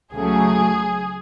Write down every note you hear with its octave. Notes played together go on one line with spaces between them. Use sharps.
C#2 C#3 F#3 A3 G#4